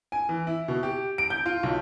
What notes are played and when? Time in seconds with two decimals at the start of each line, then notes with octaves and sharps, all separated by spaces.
0.12 G#5
0.29 E3
0.47 E4
0.68 B2
0.83 G4
1.18 D7
1.30 G6
1.46 F4
1.63 B1